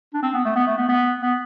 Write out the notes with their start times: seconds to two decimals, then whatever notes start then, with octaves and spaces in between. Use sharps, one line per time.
0.14 D4
0.22 C4
0.34 B3
0.45 A3
0.55 B3
0.66 A3
0.78 B3
0.89 B3
1.22 B3